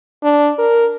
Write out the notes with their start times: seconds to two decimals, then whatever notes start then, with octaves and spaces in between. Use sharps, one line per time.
0.23 D4
0.59 A#4